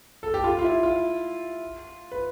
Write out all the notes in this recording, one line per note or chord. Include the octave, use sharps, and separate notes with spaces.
A4
G4
F4
F4
E4
F4
B4